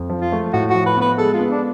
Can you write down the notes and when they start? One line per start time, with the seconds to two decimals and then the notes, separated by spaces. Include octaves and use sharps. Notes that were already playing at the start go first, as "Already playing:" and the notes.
Already playing: F2
0.10 F3
0.20 F4
0.32 A3
0.53 A2 F#4
0.70 F3 F#4
0.86 B4
0.97 B3 B4
1.18 G#3 A4
1.34 F4
1.39 B3
1.50 D4